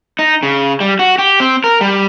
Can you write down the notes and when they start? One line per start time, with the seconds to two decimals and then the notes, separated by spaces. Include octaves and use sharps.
0.19 D#4
0.43 C#3
0.80 G3
0.99 F#4
1.19 G4
1.40 C4
1.64 A#4
1.81 G3